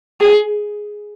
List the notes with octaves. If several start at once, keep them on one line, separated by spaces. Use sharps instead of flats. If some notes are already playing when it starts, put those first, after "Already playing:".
G#4